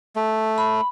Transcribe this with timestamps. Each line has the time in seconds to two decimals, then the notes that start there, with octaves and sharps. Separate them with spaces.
0.16 A3
0.58 B5